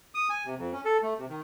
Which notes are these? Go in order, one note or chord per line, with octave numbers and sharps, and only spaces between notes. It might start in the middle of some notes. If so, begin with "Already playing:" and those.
D#6
G#5
C3
F2
C#4
A4
A3
C3
D#3